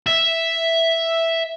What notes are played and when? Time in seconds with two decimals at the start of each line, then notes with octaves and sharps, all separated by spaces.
0.07 E5